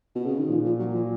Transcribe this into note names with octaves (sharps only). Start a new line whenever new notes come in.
B2
C#3
D#3
A#2 F3
F3
F#3
F3